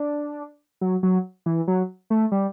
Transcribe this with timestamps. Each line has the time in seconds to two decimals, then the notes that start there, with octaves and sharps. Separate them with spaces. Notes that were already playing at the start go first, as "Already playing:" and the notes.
Already playing: D4
0.81 F#3
1.03 F#3
1.46 E3
1.68 F#3
2.10 A3
2.32 G3